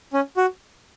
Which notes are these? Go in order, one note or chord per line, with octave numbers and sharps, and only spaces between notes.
C#4
F#4